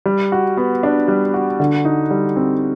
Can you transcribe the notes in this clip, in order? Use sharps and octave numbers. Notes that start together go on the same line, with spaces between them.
G3
F#4
B3
D4
G3
F#4
D3
D#4
G3
C4